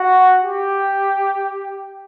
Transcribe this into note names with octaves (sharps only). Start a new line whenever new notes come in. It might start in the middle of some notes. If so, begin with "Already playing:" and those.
Already playing: F#4
G4